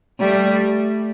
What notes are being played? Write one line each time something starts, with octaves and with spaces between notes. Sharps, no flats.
G3 A3